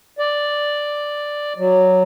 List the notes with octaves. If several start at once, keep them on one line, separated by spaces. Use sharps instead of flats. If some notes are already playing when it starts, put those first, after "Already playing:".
D5
F#3